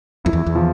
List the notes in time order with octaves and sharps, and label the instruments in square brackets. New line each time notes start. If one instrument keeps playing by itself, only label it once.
[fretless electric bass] F2 [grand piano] E4
[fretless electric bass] E2
E2
[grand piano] F3